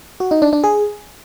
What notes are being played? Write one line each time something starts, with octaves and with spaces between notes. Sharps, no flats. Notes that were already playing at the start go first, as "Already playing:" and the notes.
F#4
D#4
D4
D4
G#4